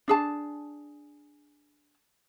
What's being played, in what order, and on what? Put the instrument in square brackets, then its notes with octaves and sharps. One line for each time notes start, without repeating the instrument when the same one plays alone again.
[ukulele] D4 G#4 A5